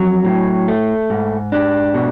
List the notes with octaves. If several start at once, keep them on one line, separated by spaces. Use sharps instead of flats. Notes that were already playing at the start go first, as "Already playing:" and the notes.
Already playing: F2 F#3
A2
A3
G#2
D4
B2